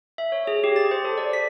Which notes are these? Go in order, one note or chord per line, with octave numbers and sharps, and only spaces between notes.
E5
C#5
G#4
G4
A6
C5
A4
D5
B6